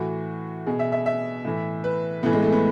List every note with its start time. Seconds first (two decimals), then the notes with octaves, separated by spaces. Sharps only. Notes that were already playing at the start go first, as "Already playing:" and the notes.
Already playing: A2 E3 F#4
0.67 B2 G#4
0.79 E5
0.92 E5
1.06 E5
1.45 A2 E3
1.84 B4
2.23 A2 E3 B3
2.33 G#3
2.43 A3
2.52 B3